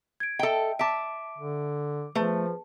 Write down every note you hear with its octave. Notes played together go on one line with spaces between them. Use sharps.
G#6 D7
A4 D#5 E5 G5
E5 A5 D6 D7
D3
F3 A3 G#4 B4